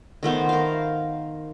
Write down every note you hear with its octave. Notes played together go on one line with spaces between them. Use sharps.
D#3 A3 B3 C5
A#4 F5